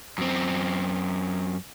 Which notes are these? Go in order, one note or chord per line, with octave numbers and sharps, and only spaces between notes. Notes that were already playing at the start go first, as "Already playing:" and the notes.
F#2 C4